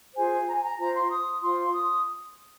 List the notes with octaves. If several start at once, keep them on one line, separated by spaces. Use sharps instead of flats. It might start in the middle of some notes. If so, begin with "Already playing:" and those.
F4 G#4 C5 G#5
A#5
G#5
A#5
F4 C5 A#5
C6
D#6
F4 C5 C6
D#6